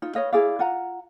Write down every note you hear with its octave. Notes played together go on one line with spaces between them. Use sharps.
D#4 F4
B4 C#5 D#5 F5
E4 G#4 D5 F5
F4 F#5 A#5